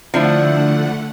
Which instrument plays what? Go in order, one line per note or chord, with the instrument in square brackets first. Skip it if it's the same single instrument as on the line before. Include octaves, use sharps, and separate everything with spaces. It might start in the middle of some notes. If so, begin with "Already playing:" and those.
[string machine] D3 A3 F#5 [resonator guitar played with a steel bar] F3 D4 E4